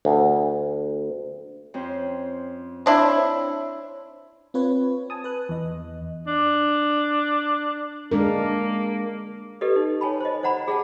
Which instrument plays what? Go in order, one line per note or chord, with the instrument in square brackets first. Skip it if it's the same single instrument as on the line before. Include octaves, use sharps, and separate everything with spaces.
[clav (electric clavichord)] D2
[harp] F2 C#4 C5
[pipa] C4 D4 E4 [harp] C5 C#5 E5
[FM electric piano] C4 F4 B4 C#5
G#5 A5 D#6
B4 F#6
E2 D#5
[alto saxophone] D4
[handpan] G#3 D4 A#4 [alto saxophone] A#3
[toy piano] G4 A4 B4 D5 D#5
D#4
C#5 G#5 A5 B5
C5 D#5
C5 D5 F#5 A#5 B5
G#4 D5 E5 F#5 A5